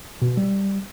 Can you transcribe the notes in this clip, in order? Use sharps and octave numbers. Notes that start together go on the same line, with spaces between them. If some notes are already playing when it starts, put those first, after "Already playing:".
B2
G3